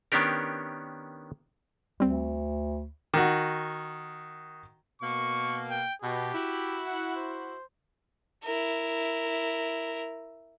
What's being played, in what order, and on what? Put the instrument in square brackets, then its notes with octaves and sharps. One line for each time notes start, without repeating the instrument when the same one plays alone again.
[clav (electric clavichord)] D#3 B3 C#4 D4 G4 A#4
[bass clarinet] D2 [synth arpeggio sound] G3 C4
[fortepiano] D#3 F#4
[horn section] B2 A#3 [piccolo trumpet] C#6
[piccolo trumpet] G5
[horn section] B2 [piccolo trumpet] G4
[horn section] E4 F#4
[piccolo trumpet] F#5
C5
[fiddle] E4 A#4